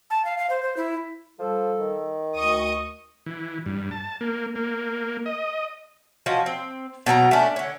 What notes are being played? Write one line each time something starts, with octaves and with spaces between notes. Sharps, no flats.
A5
F5
F5
C5
C5
E4
F3 G3 A4
D#3
D2 D#5 C#6 D#6
E3
G2
A5
A#3
A#3
D#5
F3 C#4 F#4 D#5
C4
B2 F#3 G4 A#5
A3 C#4 D4
D3 C#5